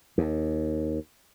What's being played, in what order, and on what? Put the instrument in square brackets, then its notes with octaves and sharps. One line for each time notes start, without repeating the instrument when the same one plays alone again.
[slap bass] D#2